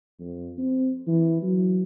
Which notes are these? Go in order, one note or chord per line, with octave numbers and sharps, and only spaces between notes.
F2
C4
E3
F#3